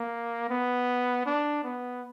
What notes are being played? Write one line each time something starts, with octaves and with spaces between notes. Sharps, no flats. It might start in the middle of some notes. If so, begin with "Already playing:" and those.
Already playing: A#3
B3
D4
B3